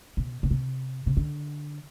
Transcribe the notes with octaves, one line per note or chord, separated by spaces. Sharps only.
B2
B2
C3
C3
D3